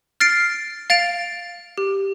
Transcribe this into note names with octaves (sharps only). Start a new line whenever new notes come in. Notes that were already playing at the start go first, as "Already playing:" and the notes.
F6 A6 C7 D7
F5 A6 D7 F7
G4